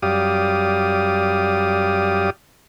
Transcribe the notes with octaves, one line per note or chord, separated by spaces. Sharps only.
F#2 G3 G4 D5 F5 D#6